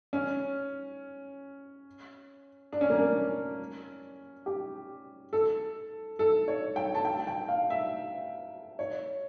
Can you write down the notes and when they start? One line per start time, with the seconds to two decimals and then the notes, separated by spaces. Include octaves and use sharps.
0.13 C#4
2.73 D4
2.81 C#4
2.90 A#3
2.98 C#4
4.46 G4
5.33 A4
6.19 A4
6.48 C#5
6.76 G5
6.95 A5
7.05 G5
7.27 G5
7.48 F5
7.70 E5
8.79 C#5